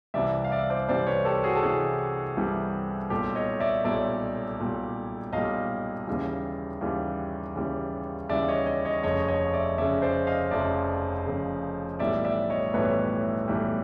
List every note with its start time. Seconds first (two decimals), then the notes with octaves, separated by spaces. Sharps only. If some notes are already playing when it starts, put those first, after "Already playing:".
0.14 C2 C3 E3 G3 D5 E5
0.44 F5
0.51 D5 E5
0.70 C5 D5
0.88 C2 C3 E3 G3 C5 D5
1.07 B4 C#5
1.25 G4 A4
1.44 F#4 G#4
1.55 A4
1.63 C2 C3 E3 G3 F#4 G#4
2.37 C2 C3 E3 G3
3.10 B1 A#2 G3 G4 A4
3.35 C#5 D#5
3.60 D5 E5
3.84 B1 A#2 G3 D5 E5
4.59 B1 A#2 G3
5.33 B1 A#2 G3 D#5 F5
6.07 D#2 C#3 E3 G3
6.81 D#2 C#3 E3 G3
7.55 D#2 C#3 E3 G3
8.29 D#2 C#3 E3 G3 D5 E5
8.48 C#5 D#5
8.66 C#5 D#5
8.85 C#5 D#5
9.03 F1 F2 C#3 C#5 D#5
9.28 C#5 D#5
9.53 D5 E5
9.78 F1 F2 C#3 D5 E5
10.02 C5 D5
10.27 D#5 F5
10.51 F1 F2 C#3 D5 E5
11.26 F1 F2 C#3
11.99 B1 A2 E3 G3 D5 E5
12.25 D5 E5
12.50 C#5 D#5
12.74 B1 A2 E3 G3 B4 C#5
13.48 B1 A2 E3 G3